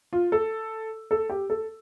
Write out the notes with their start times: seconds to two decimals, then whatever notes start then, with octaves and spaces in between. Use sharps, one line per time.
0.13 F4
0.32 A4
1.11 A4
1.30 G4
1.50 A4